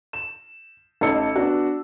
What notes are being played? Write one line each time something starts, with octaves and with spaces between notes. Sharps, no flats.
E7
A1 D#4 A4 A5 E6 C#7
B3 D4 F#4